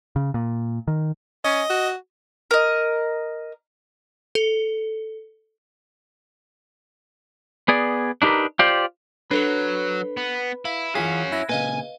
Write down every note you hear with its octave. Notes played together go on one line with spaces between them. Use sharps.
C#3
A#2
D#3
C#4 D#5
F#4
A#4 D#5
A4
B3 G#4 D5
D4 D#4 G4 A#4 B4
F4 G4 C5 D5
F#3 D4 A4 B4 C#5
B3
E4 F5
E3 C#4 F4 F#4 G#4 F5 B6 C7
E4 F#6 G#6 A#6
A#2 C#3 B4 D#5 F5 G#5